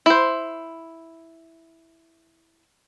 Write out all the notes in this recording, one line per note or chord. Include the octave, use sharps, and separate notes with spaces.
E4 C5